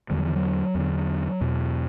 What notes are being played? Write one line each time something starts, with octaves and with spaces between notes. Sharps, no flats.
E2 D3 G3
F#3
E3
F#3
E2 D3
E2 B2